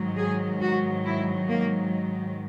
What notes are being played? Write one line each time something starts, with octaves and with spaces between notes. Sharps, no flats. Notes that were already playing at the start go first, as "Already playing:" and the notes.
Already playing: G#2 D#3 F#3
G#4
F#4
E4
A#3